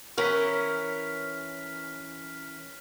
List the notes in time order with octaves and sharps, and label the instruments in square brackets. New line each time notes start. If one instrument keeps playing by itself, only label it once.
[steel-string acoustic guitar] E3 C#4 A#4 [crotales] F6 B6